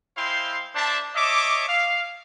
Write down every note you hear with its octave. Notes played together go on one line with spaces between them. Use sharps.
G#3 E4 C5 F5 G5 C6
A#3 D4 C5 E5 A5
C#5 D#5 E5 A5 D6
F5